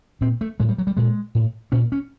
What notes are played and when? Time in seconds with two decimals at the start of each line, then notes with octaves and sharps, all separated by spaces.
0.21 A#2 C4
0.41 A3
0.60 A2 G#3
0.69 G3
0.78 F#3
0.87 G3
0.97 A#2 G#3
1.35 A2
1.72 A#2 C#4
1.92 C#4